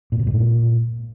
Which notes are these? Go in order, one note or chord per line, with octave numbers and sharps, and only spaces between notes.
A#2
C3
G#2
A#2